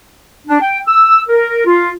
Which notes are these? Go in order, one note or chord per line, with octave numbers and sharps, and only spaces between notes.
D4
G5
E6
A#4
F4